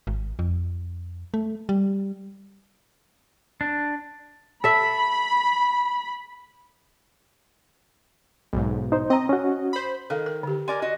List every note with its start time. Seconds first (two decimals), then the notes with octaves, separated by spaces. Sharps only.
0.07 G#1
0.39 F2
1.34 A3
1.69 G3
3.61 D4
4.64 A4 E5 B5
8.53 B1 G#2
8.92 D#4 C5
9.10 C4 D#5 A#5
9.29 C#4 F#4
9.73 C5 B5
10.10 D#3 A4 A#4 F5
10.26 A#4
10.43 D3 G4
10.68 A#4 D5 G#5 C6
10.82 F#4 D#5